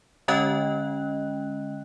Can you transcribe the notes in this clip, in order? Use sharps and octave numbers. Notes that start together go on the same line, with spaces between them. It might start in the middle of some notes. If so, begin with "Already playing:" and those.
D3 G#3 C#4 D#5 G5 F#6